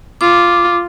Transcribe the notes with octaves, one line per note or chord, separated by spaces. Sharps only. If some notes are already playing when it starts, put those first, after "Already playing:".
F4 D6